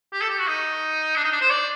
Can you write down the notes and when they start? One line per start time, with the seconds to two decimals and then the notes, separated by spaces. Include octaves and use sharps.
0.13 G4
0.21 A4
0.30 G4
0.39 F#4
0.48 D#4
1.16 D4
1.24 D#4
1.32 D4
1.41 C5
1.50 D5